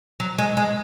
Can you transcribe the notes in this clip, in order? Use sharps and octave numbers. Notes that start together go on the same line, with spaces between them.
F#3
G#3
G#3